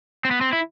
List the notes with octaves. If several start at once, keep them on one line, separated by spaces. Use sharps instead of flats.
C4
B3
C4
E4